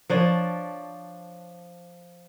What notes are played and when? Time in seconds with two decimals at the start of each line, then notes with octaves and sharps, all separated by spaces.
0.09 F3 D4 C#5